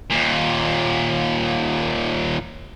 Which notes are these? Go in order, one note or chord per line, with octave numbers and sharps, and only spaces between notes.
D#2 A#2